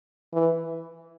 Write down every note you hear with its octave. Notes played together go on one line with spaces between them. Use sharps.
E3